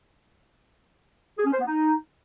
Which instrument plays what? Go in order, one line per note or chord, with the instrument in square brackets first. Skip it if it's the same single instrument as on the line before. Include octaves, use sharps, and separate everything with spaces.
[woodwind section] G#4
C#4
C5
B3
D#4